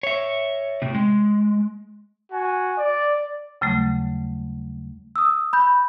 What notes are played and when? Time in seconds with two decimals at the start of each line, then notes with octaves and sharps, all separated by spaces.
0.03 C#5 E5
0.82 A2 C3
0.95 G#3
2.32 F#4 G#5
2.79 D5
3.61 D#2 C#3 F#3 G3 A3
5.16 D#6 E6
5.53 B5 G6